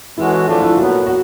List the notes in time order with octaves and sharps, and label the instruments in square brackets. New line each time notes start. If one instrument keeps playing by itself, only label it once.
[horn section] E3 G#3 C#4 F#4 A4 [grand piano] E4
[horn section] D3 F3 A3 D4 [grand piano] F4
[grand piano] E4
[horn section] A#2 F#3 B3 [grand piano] F#4
[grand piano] F#4